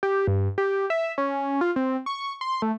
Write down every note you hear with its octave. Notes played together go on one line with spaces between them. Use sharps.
G4
G2
G4
E5
C#4
F4
C4
C#6
C6
A3